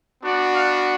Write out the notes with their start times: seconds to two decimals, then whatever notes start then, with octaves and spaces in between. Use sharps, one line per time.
0.23 B3 D4 F#4 D5
0.53 F5